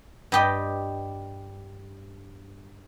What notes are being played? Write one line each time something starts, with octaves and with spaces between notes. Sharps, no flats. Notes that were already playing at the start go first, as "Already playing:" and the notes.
G2 G4 D#5